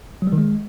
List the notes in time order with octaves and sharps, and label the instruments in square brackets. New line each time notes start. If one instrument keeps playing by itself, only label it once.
[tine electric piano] F#3
G3
D#3
G#3